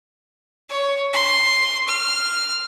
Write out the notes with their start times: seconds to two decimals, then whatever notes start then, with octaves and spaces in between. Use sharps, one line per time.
0.69 C#5
1.13 C6
1.88 F6